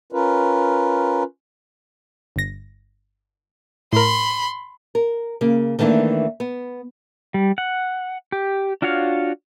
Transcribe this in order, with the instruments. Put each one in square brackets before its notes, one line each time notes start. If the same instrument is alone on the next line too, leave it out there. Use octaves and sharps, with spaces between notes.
[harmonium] C#4 F4 A#4 B4
[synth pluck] G1 A#6
[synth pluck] A2 A#4 [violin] B5 C6
[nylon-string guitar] A#4
C#3 A#3
D#3 E3 A3 A#3 D4
B3
[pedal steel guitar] G3
F#5
G4
D4 F4 F#4 C#5 F5